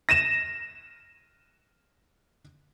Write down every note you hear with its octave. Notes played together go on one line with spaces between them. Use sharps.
A#6 D#7 E7